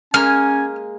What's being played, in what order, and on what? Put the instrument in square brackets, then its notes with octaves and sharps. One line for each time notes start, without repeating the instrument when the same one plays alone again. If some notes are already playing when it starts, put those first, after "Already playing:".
[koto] G#3 A#3 [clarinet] C#4 [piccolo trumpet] G#5 [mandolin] F6